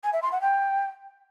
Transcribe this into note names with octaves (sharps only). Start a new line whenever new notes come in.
G#5
E5
C6
F#5
G5